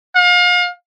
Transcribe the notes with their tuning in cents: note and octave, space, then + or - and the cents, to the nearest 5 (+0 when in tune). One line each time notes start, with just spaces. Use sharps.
F5 +35